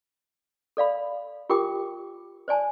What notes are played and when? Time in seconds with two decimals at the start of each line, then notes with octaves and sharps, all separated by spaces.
0.77 A4 D5 F5 B5
1.50 F4 G4 A#4 G5 D6
2.48 C5 D5 G#5 A5